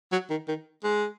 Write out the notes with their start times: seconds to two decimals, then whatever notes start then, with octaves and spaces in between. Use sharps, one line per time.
0.12 F#3
0.30 D#3
0.48 D#3
0.84 G#3